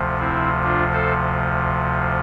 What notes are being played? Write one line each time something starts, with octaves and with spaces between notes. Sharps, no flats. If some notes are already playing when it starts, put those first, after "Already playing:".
Already playing: D2 C3 F3
C4 E4
D4 F4
A4 C5